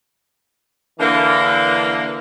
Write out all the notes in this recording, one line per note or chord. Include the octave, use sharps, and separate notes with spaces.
D3 E3 A#3